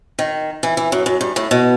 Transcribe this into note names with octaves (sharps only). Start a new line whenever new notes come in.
D#3
E3
E3
F#2
F#2
G2
A2
B2